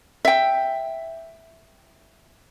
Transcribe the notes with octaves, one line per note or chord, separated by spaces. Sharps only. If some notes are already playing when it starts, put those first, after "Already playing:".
E5 G5